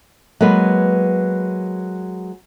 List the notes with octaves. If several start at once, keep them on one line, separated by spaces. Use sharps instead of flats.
F#3 G#3 A#3 B3 B4